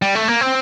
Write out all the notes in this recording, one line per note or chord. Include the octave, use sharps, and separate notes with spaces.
G3
A3
A#3
C4